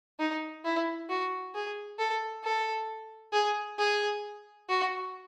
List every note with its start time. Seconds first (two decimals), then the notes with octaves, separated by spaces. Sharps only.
0.19 D#4
0.64 E4
1.09 F#4
1.54 G#4
1.99 A4
2.44 A4
3.33 G#4
3.78 G#4
4.69 F#4